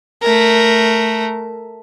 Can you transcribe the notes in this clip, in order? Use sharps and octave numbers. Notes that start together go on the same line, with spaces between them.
A3 A#4